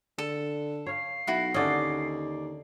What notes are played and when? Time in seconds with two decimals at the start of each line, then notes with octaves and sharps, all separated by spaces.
0.18 D3 A4
0.86 C#5 F5 C7
1.27 B1 E4 F#4
1.54 D#2 D3 C#4 D5 D#5